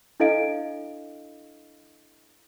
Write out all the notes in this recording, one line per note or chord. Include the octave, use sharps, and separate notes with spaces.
D4 E4 A4 D#5 F5 D7